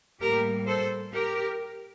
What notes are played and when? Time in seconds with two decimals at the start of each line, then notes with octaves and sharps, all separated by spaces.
0.20 A2 G3 A#3 G4 A#4
0.67 A4 C5
1.14 G4 A#4